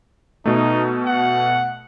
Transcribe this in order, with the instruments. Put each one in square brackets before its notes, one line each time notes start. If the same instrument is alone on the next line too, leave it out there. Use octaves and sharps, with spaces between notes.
[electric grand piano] B2 A3 [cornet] D#4
[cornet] F#5